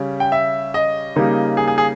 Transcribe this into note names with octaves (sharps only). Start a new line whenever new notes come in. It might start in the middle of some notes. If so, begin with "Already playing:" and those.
Already playing: C#3 G3 C#4
G5
E5
D#5
C#3 G3 A#3 D#4
G#4
G#4
G#4